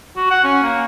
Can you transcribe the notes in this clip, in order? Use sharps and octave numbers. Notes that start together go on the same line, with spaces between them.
F#4
F#5
C#4
A#3